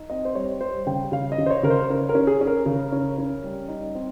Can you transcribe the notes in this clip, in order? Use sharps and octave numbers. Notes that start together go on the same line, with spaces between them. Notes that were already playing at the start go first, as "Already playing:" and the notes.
Already playing: D#4
C4 D#5
C5
G3 C#5
G3 C5
C#3 G5
C#3 F5
D#5
C#3
C5
C#5
C#3 A#4
C5
C#4 A#4
A#4
C#4
G#4
C#4
A#4
C#3
C#4
C#4
G3
D#4
C4